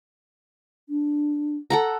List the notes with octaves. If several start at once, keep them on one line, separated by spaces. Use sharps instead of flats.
D4
A4 F#5 A#5